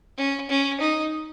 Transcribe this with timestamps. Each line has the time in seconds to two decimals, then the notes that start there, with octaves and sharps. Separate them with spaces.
0.17 C#4
0.50 C#4
0.80 D#4